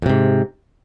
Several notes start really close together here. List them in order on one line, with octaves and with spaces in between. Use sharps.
F2 C3 G#2